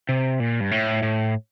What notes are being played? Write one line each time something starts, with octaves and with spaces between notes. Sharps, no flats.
C3
A#2
G2
A2
A2